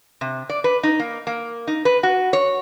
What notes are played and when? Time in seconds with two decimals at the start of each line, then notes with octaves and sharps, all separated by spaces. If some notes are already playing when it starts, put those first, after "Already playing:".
0.21 C3
0.50 D5
0.64 B4
0.83 D#4
1.00 A#3
1.27 A#3
1.67 D#4
1.85 B4
2.03 F#4
2.33 C#5